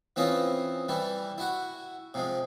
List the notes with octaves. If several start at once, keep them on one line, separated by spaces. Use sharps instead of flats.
E3 C4 C#4 E4 F4 D#5
E3 G3 E4
E4 F#4 F#5
C3 F3 G#3